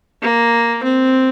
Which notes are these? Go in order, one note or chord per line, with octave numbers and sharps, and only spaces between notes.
A#3
C4